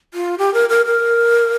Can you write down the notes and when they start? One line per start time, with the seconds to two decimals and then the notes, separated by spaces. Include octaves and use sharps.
0.14 F4
0.38 G4
0.54 A#4
0.69 A#4
0.86 A#4